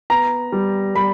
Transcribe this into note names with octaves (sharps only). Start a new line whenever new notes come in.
B3 A#5
G3
G3 B5